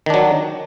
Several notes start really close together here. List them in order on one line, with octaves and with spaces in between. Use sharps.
D#3 D4 F#3